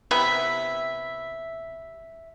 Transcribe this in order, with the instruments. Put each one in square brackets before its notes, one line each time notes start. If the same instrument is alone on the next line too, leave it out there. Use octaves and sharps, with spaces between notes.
[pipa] C3 B3 E4 [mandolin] E5